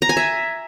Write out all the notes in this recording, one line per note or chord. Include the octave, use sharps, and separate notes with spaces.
A#5
G#5
E5